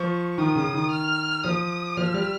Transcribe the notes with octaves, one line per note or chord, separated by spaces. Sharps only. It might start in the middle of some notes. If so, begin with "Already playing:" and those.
Already playing: F3 C#6
D#3 D#6
C#3
D#3
F6
F3 D#6
F3 F6
G3